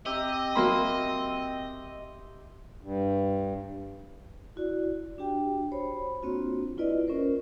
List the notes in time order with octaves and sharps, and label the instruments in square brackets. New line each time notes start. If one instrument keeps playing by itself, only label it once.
[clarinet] C4 [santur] G4 E5 A#5 [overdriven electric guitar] D#5
[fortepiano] F#3 A#3 B5 [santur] C6
[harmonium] G2
[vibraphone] E4 F#4 D5
D4 F#4 G4 G5
C5 C#5 B5
A#3 C4 D4 F4 F#4
E4 F4 B4 D5 D#5
C#4 F4 A#4 C5